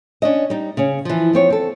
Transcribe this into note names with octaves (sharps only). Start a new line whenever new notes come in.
C#4 D4 D#5
G3 D#4
C#3 C#4
E3 F3
F3 C4 C#5
C4 A4